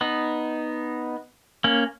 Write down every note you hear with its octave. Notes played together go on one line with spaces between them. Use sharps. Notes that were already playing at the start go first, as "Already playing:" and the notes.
B3 D#4
A#3 C#4